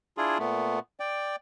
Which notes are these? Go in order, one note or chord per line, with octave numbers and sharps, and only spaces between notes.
D4 E4 F4 G#4
A#2 A3 B3
D5 G5